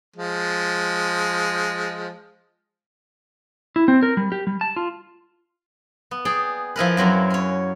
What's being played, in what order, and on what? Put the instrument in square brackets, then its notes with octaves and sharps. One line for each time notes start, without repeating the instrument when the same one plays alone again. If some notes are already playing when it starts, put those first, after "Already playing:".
[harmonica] F3 G#3
[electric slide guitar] E4
C4
A#4
G3
G4
G3
A5
F4
[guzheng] B3
G#4 D5 G5
F3 E4 A#4 B4
F#2 F#3 C4 A#4
C#4 C#5